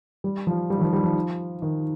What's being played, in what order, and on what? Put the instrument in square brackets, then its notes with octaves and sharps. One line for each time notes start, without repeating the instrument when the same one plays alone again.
[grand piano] G3
F3
G3
D#3
F3
G3
F3
D#3